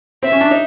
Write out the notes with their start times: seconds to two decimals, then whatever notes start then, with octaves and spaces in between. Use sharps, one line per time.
0.23 C4 E5
0.32 C#4
0.41 D4
0.51 D#4